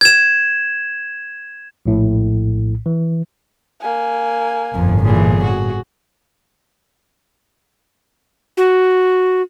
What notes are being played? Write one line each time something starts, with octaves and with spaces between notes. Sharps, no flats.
G#6 E7
A#1 A2
E3
A#3 G#5
G1 F2 A2
A#2 E3 G#4
F#4
F#4